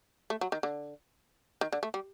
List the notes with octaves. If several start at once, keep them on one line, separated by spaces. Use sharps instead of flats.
A3
F#3
D#3
D3
D#3
D3
A3
G3